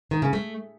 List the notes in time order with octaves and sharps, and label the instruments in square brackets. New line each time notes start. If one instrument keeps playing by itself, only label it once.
[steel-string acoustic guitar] D#3
C#3
A3